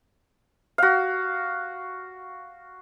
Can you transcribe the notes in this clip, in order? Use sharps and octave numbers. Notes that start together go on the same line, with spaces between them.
F#4 F5